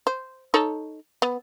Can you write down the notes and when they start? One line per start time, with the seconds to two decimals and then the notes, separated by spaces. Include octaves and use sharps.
0.07 C5
0.54 D#4 A4 C#5
1.22 B3